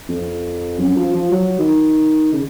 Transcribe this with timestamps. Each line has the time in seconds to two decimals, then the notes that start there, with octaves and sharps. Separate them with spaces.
0.09 F2
0.79 F#2
0.97 F3
1.14 F3
1.31 F#3
1.59 D#3
2.33 C#3